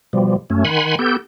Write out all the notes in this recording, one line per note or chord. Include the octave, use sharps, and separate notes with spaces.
B2 F3 G3
F#2 A3 C#4
D#3 F#5 G#5 B5 C6
B3 G4 A4 G6